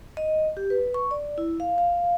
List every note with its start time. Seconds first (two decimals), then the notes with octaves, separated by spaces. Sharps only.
0.17 D#5
0.57 G4
0.70 B4
0.94 C#6
1.11 D5
1.38 E4
1.60 F5
1.78 F5